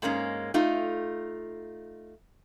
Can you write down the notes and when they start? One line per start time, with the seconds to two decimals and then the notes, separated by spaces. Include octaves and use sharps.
0.02 G#2 G#3 A#3 C#4
0.54 A3 D#4 F4